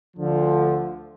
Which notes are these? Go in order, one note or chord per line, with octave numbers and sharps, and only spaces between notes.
D2 D3 F3